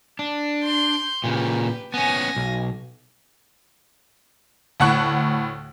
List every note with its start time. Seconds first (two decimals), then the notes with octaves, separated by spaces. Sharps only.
0.19 D4
0.64 C6 G6
1.24 A#2 C#3 G4 B4
1.94 B3 C#4 G#5 A#6
2.36 B1
4.80 D2 A2 F#5 A5 C#6 F#6